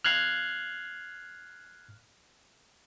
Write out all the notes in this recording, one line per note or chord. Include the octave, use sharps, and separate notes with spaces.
F6 F#6 G#6 C7